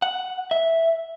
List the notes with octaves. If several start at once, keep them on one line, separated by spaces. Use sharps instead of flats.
F#5
E5